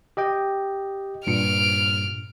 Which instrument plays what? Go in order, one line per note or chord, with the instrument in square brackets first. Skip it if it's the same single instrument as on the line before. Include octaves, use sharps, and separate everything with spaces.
[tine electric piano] G4 D#5 G5
[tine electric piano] G2 A#2 C#7 [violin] F6 D7